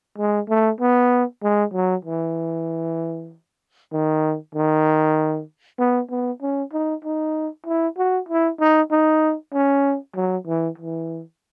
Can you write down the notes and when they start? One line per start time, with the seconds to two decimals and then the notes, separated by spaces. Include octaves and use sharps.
0.18 G#3
0.49 A3
0.80 B3
1.42 G#3
1.74 F#3
2.05 E3
3.92 D#3
4.55 D#3
5.79 B3
6.10 B3
6.41 C#4
6.73 D#4
7.04 D#4
7.66 E4
7.98 F#4
8.28 E4
8.60 D#4
8.91 D#4
9.53 C#4
10.16 F#3
10.47 E3
10.78 E3